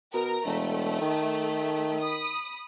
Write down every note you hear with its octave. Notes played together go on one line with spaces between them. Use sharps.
B2 A#4 A#5
E1 A3
D#3
B5 D#6